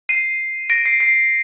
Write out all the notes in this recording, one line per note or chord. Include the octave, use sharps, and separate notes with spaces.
C7 D#7
A#6 D7
C7
C7